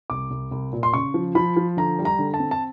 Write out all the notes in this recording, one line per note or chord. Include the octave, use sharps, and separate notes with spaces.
C2 D6
C2
C2
A#2
C6
C#3 C#6
F3
F3 B5
F3
D3 A#5
G3
A#5
D3
A5
C4
A5